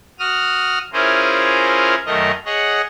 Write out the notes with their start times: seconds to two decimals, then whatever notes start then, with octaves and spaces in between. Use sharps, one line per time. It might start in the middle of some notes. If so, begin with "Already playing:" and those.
0.19 F#4 D#6 F6
0.93 C#4 E4 F4 G#4 A#4 C5
2.06 F#2 D#3 A3 A#4 D#5
2.45 G#4 C#5 D#5 F#5